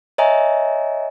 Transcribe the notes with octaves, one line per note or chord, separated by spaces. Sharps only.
C#5 D#5 E5 G#5 A#5